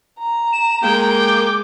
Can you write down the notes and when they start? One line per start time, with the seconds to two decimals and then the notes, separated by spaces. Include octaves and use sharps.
0.19 A#5
0.53 E7
0.82 G#3 A#3 G5
1.16 D6